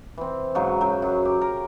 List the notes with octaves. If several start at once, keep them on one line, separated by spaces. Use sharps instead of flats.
E3 C4
G#2 C#3 F#3 G#3
F#2 F#3 G5
F#2
G4
A#4